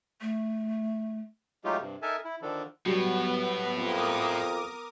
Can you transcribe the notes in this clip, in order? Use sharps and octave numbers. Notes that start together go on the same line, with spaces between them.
A3
F#3 G#3 A3 D#4 F4 G4
G2 C3
D#4 A4 A#4 E5 G#5 A5
E4
D3 D#3 F3 D4 A4
A2 F#3 G3 B3
F2 A#4 D6 D#6